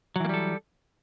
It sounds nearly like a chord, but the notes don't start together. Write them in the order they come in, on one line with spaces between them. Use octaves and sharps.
F#3 E3 A#3 G3 A4